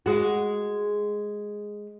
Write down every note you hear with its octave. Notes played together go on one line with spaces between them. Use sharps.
G#3 F#4